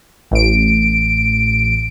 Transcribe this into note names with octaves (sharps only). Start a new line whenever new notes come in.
A1 D7